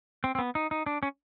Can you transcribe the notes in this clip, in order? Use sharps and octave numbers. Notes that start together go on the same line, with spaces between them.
C4
C4
B3
D#4
D#4
D4
C#4